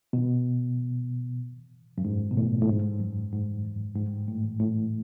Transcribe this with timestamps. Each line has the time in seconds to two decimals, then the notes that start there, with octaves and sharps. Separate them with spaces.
0.13 B2
1.98 F#2
2.05 G#2
2.31 B2
2.37 A2
2.62 A2
2.69 G#2
3.00 F#2
3.33 G#2
3.65 E2
3.96 G#2
4.28 A2
4.59 A2